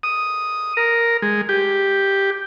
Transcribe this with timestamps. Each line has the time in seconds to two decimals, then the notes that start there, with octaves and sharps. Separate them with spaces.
0.03 D#6
0.77 A#4
1.22 G#3
1.49 G4